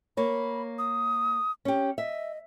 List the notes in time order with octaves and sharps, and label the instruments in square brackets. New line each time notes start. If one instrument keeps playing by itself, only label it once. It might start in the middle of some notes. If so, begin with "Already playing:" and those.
[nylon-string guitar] A#3 C#5 [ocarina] B5
[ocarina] D#6
[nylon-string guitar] C#4 G4
[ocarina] D#5 [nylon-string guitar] E5